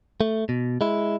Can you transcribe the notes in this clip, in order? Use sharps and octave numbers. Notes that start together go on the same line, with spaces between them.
A3
B2
G#3 E4